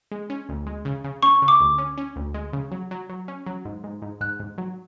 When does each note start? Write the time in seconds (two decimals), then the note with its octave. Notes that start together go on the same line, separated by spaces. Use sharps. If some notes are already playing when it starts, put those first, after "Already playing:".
0.12 G#3
0.30 C#4
0.49 D2
0.67 G#3
0.85 C#3
1.04 C#3
1.23 C#4 C#6
1.42 C#3
1.48 D6
1.60 D2
1.78 C#4
1.98 C#4
2.16 D2
2.34 G#3
2.53 C#3
2.72 F#3
2.91 F#3
3.09 F#3
3.28 C#4
3.46 F#3
3.65 G#2
3.84 G#2
4.02 G#2
4.21 G#2 F#6
4.40 G#2
4.58 F#3